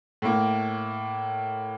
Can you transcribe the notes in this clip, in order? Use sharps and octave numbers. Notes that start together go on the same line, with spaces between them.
A2 A#3